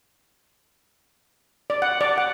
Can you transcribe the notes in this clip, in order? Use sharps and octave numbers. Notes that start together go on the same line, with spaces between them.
D5
F#5
D5
F#5